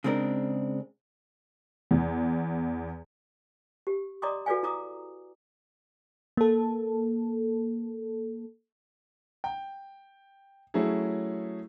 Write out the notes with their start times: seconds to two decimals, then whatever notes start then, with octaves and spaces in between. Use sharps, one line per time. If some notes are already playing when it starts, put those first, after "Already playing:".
0.04 C#3 G#3 C4 D4 A#4
1.91 E2
3.87 G4
4.22 D5 D#5 A#5 C6 D6 D#6
4.46 F#4 A4 B4 D5 F5 G#5
4.63 E4 A#5 D6 D#6
6.37 A#3 A4
9.44 G5
10.74 F#3 A3 C#4 E4 G#4